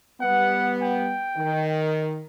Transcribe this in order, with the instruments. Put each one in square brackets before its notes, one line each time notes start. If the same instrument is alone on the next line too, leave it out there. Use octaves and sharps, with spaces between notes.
[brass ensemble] G3 B3 [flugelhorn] F#5
[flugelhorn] G5
[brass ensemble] D#3